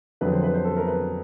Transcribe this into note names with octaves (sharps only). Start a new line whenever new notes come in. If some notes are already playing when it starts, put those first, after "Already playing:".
F2 D3 F#3 B4
C5
B4
C5
A4
A#4
B4